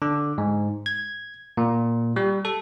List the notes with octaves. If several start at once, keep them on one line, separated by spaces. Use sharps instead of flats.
D3
G#2
G#6
A#2
G3
A4